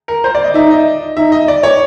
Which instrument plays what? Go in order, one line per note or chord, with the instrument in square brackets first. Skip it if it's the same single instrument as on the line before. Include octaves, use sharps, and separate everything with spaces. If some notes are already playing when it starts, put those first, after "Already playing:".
[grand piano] A#4
C5
D5
D#5
[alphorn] D#4 [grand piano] E5
[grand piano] D#5
[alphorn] D#4 [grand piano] E5
[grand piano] D#5
D5
C#5